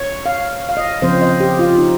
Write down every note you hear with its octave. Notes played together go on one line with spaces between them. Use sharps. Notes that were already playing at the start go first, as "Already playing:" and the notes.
Already playing: C#5
F5
F5
D#5
C#3 F3 C4 C5
D#5
G4
F4
D#4